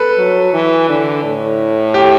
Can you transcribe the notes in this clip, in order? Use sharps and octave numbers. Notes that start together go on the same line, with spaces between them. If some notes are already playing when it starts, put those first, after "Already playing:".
Already playing: A4 B4
F#3
E3
D3
A2
G4